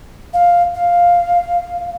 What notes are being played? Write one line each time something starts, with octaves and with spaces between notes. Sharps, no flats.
F5
F5